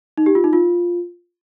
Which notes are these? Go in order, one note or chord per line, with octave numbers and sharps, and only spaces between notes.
D#4
G4
F4
D#4
F4